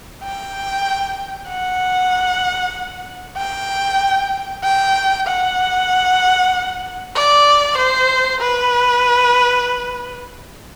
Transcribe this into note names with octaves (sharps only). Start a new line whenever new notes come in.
G5
F#5
G5
G5
F#5
D5
C5
B4